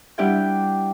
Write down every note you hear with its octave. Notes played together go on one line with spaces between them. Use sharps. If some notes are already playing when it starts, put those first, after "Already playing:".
G3 D4 E4 G4 F#5 G5